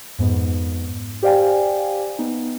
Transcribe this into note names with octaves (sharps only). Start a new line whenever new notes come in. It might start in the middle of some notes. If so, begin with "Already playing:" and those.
F2 G#2 B3
G4 C5 D5 F5 G5 G#5
B3 D#4